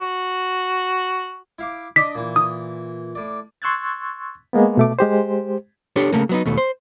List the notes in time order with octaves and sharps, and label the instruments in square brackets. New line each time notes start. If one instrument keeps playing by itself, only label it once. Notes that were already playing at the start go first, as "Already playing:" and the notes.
[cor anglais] F#4
[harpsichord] E4 F5 D6
[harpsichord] D4 D5 D#5 [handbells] B6
[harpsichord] A#2 E3
[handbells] D#6
[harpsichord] A2 D5
[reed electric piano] C6 C#6 E6 F#6 G#6 A6
G#3 A#3 B3
B2 A3 D6
G#3 G4 C5
[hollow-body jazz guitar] D4 G4 A4 C#5
C#3 A3 A#3
F#3 B3 D#4
D#2 B2 A3
C5